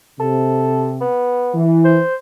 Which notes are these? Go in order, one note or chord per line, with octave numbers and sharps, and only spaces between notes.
C3 A4
B3
E3
C5